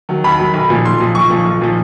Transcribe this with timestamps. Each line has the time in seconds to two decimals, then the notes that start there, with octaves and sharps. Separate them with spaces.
0.09 D#3 F#3
0.24 D#2 B5
0.39 D#3 F#3
0.54 B1
0.69 A#2 F3
0.85 B1 C6
1.00 A#2 F3
1.15 B1 C#6
1.30 A#2 F3
1.46 B1
1.61 A#2 F3